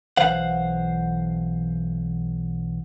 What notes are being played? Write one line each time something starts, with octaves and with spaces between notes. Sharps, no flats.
B1 E3 C5 F5 F#5